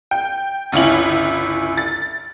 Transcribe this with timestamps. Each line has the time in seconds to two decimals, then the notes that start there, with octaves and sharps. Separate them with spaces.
0.11 G5
0.72 G1 C#2 C#4 E4 F#7
1.77 A6